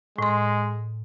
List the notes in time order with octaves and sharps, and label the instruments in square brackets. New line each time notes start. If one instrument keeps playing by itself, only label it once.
[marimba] A2 C6 [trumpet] G#3